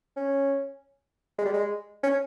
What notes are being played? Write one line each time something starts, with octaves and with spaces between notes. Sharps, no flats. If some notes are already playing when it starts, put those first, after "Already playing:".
C#4
G#3
G3
G#3
C#4